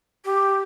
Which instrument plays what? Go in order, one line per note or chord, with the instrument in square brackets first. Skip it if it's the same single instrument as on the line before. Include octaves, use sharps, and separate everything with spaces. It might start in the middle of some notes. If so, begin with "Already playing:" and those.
[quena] G4